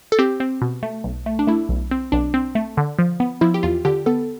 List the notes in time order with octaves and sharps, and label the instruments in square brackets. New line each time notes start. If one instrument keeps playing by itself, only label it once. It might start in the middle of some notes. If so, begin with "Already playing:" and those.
[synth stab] A4
C4 G4
C4
B2
A3
B1
A3
D4
A3 E4
B1
C4
B1 D4
C4
A3
D3
F3
B3
F3 E4
G4
E2 F4
D3 G4
B3 A4